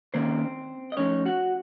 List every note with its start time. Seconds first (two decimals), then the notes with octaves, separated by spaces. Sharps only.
0.14 D#3 A#3 C4 C#4 C5
0.92 D#5
0.97 F3 A3 C#4 D#4 C#5
1.25 F#4 F#5